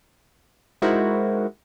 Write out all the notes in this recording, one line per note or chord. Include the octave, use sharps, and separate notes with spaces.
G#3 D#4 E4 F#4 A#4 C5